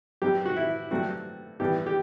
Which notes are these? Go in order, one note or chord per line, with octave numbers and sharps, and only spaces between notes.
G2 F#3 C4 G4
F#4
E4
G2 F#3 A3 C4 F#4
G2 E3 B3 G4
G4